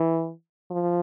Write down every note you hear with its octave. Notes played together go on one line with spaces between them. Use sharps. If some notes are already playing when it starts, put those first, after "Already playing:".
Already playing: E3
F3